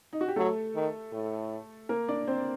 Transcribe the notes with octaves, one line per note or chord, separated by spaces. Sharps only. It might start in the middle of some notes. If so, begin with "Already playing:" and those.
D#4
F#4
G4
F#3 A3 A4
D#3
A2
A#3 A#4
D4 D5
C4 C5